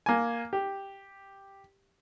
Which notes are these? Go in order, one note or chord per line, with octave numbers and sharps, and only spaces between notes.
A#3 G#5
G4